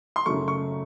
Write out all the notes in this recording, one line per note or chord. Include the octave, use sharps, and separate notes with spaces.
C6
F#2 C#3 F#3 A3 C#6
C#6